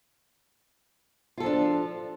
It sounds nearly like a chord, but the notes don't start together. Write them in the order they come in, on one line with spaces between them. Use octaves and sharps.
F4 A4 F3 D4